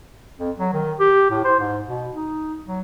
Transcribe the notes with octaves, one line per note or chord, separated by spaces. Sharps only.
F2
F#3
D#3
G4
A2
C5
G#2
B2
D#4
F#3